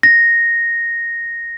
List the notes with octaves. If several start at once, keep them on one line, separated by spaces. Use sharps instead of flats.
A#6